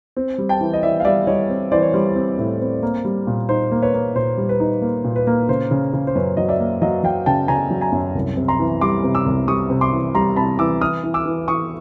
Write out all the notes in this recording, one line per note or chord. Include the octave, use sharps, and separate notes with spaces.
C4
G3
G5 A5
E3
D#5
E3 D5 E5
F5
G3 D5 E5
G3 C#5 D#5
C4
E3 C5 D5
C#5
G3 C5
C4
A2
C4
A#3
G3
A#2
D#4 C5
A#3
B4 C#5
A#3
A#2 C5
G3
B4
D#4
A#3
A#2
B4
A#3
C#3 C5
C#3
C#3
C5
F#2 B4 C#5
F#3 D#5
D5 E5
A#3
F#3 D#5 F5
F#3 F5 G5
C#3 G5 A5
C#3 G#5 A#5
F#3
G#5 A#5
F#2
C2
C3
A#5 C6
E3
G3 C6 D6
C3
D6 E6
C2
G3 C#6 D#6
C3
C6 D6
E3
G3 A#5 C6
C3 A5 B5
E3 D6 E6
E3 D#6 F6
E3
D6 E6
E3
E3 C#6 D#6